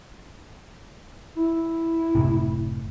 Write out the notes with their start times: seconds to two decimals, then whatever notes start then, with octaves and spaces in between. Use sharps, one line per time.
1.37 E4
2.15 F#1 A2 C3